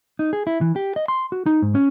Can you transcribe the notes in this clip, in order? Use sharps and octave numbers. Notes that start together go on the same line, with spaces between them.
D#4
G#4
E4
E3
G4
D#5
C6
F#4
D#4
G#2
C#4